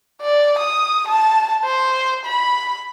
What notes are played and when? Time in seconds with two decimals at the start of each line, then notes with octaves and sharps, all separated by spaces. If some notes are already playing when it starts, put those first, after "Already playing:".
0.22 D5
0.59 D#6
1.08 A5
1.65 C5
2.26 B5